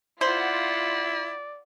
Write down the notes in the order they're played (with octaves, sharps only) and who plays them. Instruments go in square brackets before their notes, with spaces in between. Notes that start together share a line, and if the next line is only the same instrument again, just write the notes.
[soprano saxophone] E4 [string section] F4 F#5 [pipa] C5 [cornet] D5